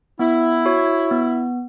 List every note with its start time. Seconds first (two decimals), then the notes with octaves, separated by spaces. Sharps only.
0.19 B3 E4
0.66 F#4 C#5
1.11 B3